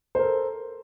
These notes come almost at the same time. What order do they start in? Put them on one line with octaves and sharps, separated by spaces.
C5 A#4 A4